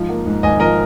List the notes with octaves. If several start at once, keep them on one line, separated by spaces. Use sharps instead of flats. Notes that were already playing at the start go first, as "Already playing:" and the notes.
Already playing: G#2 F3
A#3
G#2
G#1 D#5 G#5
F3 A#4 D#5